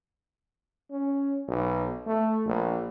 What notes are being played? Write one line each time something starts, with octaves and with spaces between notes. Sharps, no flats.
C#4
B1
A3
A#1